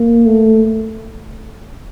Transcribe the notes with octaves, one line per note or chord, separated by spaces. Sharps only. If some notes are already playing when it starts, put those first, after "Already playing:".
Already playing: A#3
A3